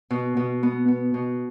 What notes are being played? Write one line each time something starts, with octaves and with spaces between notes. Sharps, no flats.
B2
B2
B3
B3
B2